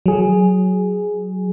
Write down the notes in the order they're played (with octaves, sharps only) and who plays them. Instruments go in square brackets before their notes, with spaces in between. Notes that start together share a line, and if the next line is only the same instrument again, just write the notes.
[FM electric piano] F#3 G#4